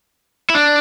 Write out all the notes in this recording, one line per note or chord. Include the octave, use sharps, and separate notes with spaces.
E4
D4